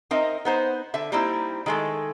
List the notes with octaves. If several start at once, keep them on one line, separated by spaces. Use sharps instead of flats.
C4 D#4 A#4 D#5 E5
B3 D#4 C5
D3 E5
G3 A#3 C4 D#4 E4
D#3 G#3 A3